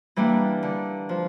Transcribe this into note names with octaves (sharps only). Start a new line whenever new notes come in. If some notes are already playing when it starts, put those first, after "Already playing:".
E3 G3 A#3 D4
D3
F3